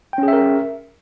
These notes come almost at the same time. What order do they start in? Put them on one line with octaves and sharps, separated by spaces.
G5 C#4 G#4 E5 A#4